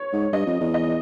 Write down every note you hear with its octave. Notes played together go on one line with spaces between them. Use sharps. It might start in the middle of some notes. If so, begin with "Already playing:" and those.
Already playing: C#5
G#2
G2 D#5
F2
E2
D#5